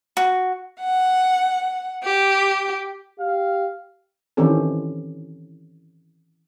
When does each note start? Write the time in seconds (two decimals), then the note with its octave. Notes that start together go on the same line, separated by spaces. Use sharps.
0.17 F#4
0.80 F#5
2.04 G4
3.19 G4 F5
4.37 D#3 E3 C4 C#4 G4 A4